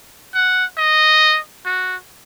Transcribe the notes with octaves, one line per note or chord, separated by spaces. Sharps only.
F#5
D#5
F#4